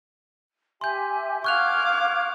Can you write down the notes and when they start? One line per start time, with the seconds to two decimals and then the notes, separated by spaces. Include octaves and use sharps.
0.81 G4 E5 G#5 C6 G6
1.44 F5 F#5 C#6 D6 F6 F#6 G#6 F7